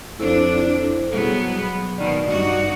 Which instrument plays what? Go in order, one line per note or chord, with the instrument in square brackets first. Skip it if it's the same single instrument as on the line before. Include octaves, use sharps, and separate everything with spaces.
[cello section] F2 D4 [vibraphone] E4 A4 C5
[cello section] B2 F#3 B3 [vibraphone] G3 G#4
[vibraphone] B5
[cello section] B2 D#3 [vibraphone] D5
[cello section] G2 D#4 F#4